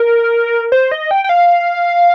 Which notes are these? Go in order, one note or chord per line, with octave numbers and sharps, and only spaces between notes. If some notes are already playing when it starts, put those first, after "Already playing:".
Already playing: A#4
C5
D#5
G5
G5
F5